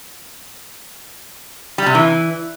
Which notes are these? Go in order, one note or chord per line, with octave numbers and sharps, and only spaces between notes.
G3
C3
E3